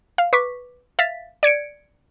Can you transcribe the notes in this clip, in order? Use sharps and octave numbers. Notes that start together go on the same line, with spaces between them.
F5
B4 C#6 D6 B6
E5 F5 A6 B6
D5 G#6 C#7 D7